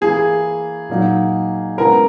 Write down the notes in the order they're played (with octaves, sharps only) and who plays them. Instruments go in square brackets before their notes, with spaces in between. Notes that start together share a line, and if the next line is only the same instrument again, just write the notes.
[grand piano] E3 A#3 E4 [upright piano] G#4
[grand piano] A#2 F#3 A#3 D#4
[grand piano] C#3 G#3 B3 E4 [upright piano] A#4